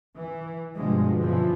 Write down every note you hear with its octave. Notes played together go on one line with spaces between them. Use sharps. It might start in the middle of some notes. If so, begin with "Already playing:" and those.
E3
G2 B2 D3 F3 G#3
F#2 A#2 E3 F3